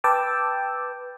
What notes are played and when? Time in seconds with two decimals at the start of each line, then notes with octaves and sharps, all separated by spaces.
0.04 B4 G5 A5 D6 E6